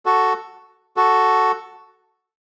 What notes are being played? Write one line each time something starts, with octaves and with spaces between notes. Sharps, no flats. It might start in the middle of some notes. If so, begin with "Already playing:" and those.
F#4 A4
F#4 A4